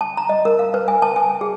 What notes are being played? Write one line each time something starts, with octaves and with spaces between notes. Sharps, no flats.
A5
A#5
D#5
A#4
F5
B4
G#5
A5
G#5
G#4